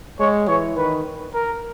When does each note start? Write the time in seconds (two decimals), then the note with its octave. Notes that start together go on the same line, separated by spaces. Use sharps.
0.19 G#3 C#5
0.48 E3 C#5
0.76 D#3 B4
1.34 A#4